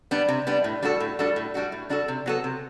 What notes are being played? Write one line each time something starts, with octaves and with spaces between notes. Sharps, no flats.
G3 B3 D4
C3
G3 B3 D4
A2
G3 D4 F#4 A4
A2
G3 D4 F#4 A4
A2
G3 D4 F#4 A4
A2
G3 D4 F#4 A4
C3
F#3 B3 F#4 A4
C3